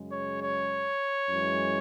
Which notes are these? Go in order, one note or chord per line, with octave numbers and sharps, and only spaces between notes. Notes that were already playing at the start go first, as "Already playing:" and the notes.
Already playing: F#2 C#3 G#3
C#5
C#5
F#2 E3 G#3